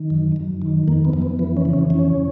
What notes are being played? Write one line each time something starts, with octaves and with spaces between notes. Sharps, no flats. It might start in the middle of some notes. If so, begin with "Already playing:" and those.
Already playing: D#3
F#2
F#2
D#3
F2 A#3
B3
F2
B3
E3 B3
C#4
C#3
C#4
F2 C#4